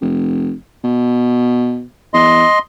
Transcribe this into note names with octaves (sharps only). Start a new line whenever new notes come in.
F1
B2
E2 D#5 C6